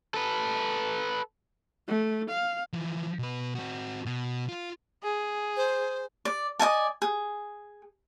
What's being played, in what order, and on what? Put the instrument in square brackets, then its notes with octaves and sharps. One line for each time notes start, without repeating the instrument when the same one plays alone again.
[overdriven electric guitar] A4 B4
[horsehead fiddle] A3
F5
[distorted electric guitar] E3 F3
B2 B4
C4 F#4
B2
F4
[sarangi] G#4
[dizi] C5
[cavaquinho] D5
D5 D#5 G#5 A5
G#4